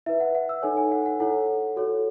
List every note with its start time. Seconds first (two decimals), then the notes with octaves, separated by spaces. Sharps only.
0.06 E4 B4 E5
0.20 F#5
0.35 F#5
0.49 E6
0.62 D#4 A4 C#5 G#5
0.77 G#5
0.92 F#5
1.06 F#5
1.20 E4 A4 C#5 F#5
1.76 F#4 A4 C#5